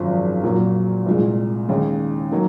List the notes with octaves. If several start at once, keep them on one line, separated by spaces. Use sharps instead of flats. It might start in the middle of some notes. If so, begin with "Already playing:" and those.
Already playing: G#1 F#2 F3
A#2 F#3 A#3
C2 A#2 G#3
D#2 C#3 G#3 D#4
F#3 A#3 D#4